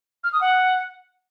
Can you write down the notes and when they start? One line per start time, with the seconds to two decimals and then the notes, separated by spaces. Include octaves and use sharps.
0.24 F6
0.33 D#6
0.41 F#5